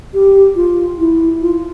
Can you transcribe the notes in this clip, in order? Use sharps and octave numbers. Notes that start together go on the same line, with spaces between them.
G4
F4
E4
F4